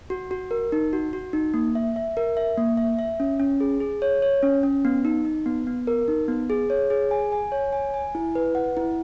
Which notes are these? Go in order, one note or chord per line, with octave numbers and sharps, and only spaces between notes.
F#4
F#4
A#4
D#4
F#4
F#4
D#4
A#3
E5
E5
A#4
E5
A#3
E5
E5
C#4
C#4
G#4
G#4
C#5
C#5
C#4
C#4
B3
D#4
D#4
B3
B3
A#4
D#4
B3
G#4
C#5
G#4
G#5
G#5
C#5
G#5
G#5
E4
B4
F#5
E4